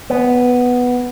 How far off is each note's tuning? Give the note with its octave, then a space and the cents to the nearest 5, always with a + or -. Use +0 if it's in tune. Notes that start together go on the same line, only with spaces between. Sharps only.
B3 +0